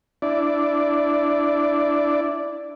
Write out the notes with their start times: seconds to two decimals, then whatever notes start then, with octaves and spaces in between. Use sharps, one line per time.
0.22 D4 E4 D5